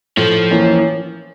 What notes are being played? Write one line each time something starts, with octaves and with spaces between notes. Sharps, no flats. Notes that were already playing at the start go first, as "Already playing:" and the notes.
A2 F3
E3 A#3 C#4